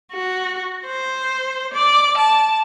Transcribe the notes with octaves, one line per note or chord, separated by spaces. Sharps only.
F#4
C5
D5
A5